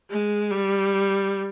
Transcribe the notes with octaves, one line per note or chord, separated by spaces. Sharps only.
G#3
G3